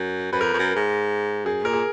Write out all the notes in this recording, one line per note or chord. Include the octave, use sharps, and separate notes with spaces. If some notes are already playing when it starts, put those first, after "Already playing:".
Already playing: F#2
F#2 B4
F2 A#4
F2
F#2
G#2
F#2 G#4
A#2 A#4
G#4